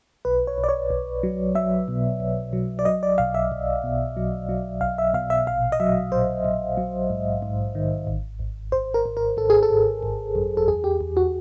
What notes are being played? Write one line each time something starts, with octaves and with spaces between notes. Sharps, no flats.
B1 B4
C#5
B1
D5
C#5
B1
F#3
F#3 E5
B2
B1
F#3
D5
F#3 D#5
D5
B1 F5
E5
B1
B2
F#3
F#3
B1 F5
E5
B2 F5
E5
A#1 F5
D#5
F#3 E5
A#1 C5
A#1
F#3
G#2
G#2
D#3
G#1
G#1
G#1 C5
A#4
G#1
A#4
G#1 A4
G#4
A4
G#1
G#1
F#2
A4
E2 G#4
G4
E2
F#4